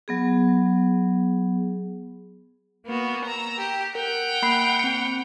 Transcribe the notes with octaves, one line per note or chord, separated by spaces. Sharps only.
F#3 B3 G#4
A#3 B3 F#4
A#5 E6
G4
A#4 F#5 G5 F6
A#3 B5 C7
C4 C#7